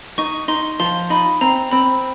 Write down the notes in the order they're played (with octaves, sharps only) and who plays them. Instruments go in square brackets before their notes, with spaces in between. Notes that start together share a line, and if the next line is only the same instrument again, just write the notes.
[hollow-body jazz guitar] D#4 [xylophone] C#6
[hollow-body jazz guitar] D#4 [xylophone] C6
[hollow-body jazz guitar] F3 [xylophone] C6
[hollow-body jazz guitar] D#4 [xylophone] B5
[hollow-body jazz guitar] C4 [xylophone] A#5
[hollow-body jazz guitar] C4 [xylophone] B5